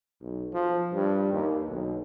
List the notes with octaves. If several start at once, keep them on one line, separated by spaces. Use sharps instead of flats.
B1
F3
G2
D#2
B1